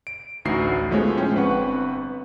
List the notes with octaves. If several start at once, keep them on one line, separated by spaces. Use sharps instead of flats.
D7
A1 D2 D#4 F#4 C7
F3 G#3 A3 B3 C#5
A2 C#4 G5
G1 C4 B4 F#5 C#6